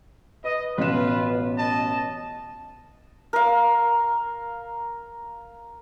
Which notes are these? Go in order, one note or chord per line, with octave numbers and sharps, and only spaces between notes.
B4 D#5
A1 B2 F4 B4 E7
D#5 A5
A#4 F5